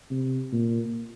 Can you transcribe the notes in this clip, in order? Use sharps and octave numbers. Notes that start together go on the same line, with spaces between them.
C3
A#2